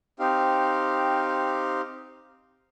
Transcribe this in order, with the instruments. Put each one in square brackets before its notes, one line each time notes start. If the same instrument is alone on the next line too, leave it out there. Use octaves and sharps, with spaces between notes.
[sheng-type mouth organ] C4 D#4 G4 F5